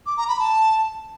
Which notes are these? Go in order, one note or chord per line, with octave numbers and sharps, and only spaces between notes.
D6
A#5
B5
A5